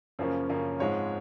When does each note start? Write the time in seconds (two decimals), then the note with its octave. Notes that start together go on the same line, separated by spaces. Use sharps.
0.19 F#2 C#3 F3 A#3 C#4
0.49 F#2 C#3 F3 A#3 C#4
0.80 G#2 F3 G#3 C4 C#5